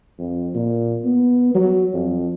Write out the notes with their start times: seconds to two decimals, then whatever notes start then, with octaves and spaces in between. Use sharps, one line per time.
0.19 F2
0.55 A#2
1.04 B3
1.55 F#3
1.94 F2